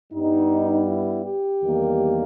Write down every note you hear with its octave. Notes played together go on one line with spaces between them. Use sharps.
G2 G3 B3 D#4
E4
G4
E2 D#3 G3 A#3